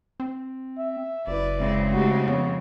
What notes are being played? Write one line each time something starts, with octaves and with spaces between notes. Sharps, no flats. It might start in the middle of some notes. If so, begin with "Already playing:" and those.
C4
E5
F#1 E4 B4 D5
C#3 G#3 C4 E5
A3 D#4 F#4 G4
F2 B3 C#5